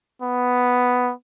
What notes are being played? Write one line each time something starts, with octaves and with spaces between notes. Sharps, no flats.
B3